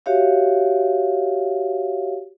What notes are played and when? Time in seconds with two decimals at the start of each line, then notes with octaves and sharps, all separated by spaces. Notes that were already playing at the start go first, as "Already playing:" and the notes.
0.06 F#4 G4 C#5 E5 F5